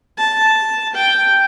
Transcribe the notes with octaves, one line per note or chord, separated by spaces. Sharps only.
A5
G5